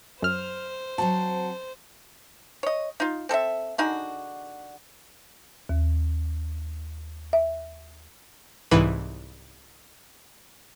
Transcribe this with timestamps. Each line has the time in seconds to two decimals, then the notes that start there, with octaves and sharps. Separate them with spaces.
0.22 F#2 C5 F6
0.98 F#3 C4 F#4 A5
2.63 C#5 D#5
3.00 D#4 F4
3.29 C4 A4 D#5 E5
3.78 D3 D#4 F#4 G#4
5.69 D#2
7.33 E5
8.71 C2 G#2 E3 B4